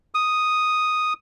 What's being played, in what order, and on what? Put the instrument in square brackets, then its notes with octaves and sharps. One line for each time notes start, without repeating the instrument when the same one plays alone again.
[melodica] D#6